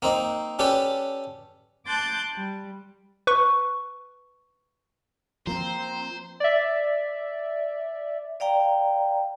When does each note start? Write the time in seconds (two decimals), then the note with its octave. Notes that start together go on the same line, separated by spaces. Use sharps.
0.02 A#3 C4 D#4
0.59 C#4 G4 A4 B4 D5
1.87 A5 C6 D6 F#6 G6 A6
2.35 G3
3.27 B4 C#6
5.47 F3 A#3 C4 C5 A#5
6.40 D5 E5
8.40 D5 F5 G5 A#5